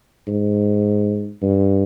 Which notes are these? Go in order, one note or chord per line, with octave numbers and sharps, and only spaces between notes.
G#2
G2